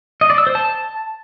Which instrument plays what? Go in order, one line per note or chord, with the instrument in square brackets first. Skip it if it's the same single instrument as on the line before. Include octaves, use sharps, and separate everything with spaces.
[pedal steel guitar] D#5
D5
E6
C5
A5